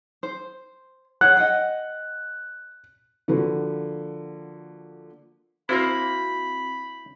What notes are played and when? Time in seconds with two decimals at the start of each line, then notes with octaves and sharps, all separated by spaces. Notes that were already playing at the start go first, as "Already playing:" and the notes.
0.23 C5
1.21 G#4 C#5 F#5 F#6
1.37 D#5 F#5 G5
3.28 D3 F3 A#3 F#4 B4
5.69 A#3 C4 E4 F#4 C5 B5 C6